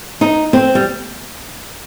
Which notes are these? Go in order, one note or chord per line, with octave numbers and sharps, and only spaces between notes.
D#4
C4
G3